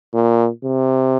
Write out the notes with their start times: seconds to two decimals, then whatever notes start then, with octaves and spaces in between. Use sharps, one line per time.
0.13 A#2
0.64 C3